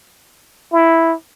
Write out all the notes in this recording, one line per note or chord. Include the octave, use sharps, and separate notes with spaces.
E4